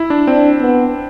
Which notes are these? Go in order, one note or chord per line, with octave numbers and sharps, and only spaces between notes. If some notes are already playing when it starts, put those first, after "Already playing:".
Already playing: E4
D4
C4 D4
B3